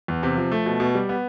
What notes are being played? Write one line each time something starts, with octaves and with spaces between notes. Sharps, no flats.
E2
C3
F3
A3
B2
B2
G3
B3